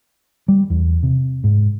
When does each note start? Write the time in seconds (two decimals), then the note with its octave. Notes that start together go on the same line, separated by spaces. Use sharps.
0.48 G3
0.70 E2
1.03 C3
1.44 G#2